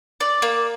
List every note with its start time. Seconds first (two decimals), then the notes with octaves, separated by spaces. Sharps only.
0.20 D5
0.42 A#3